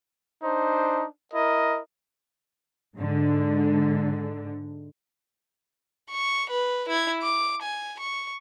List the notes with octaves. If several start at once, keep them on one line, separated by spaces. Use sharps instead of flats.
D4 D#4 C5
E4 A#4 D#5
G#2 D3
C#6
B4
E4 G#6
D6
G#5
C#6